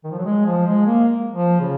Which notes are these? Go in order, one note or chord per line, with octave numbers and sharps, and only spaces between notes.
D#3
F3
F#3
G#3
F3
G#3
A#3
F3
C#3